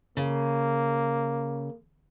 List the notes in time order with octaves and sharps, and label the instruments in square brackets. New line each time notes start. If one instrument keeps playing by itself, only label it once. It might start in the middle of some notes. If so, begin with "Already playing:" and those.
[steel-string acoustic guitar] C#3 [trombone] A#3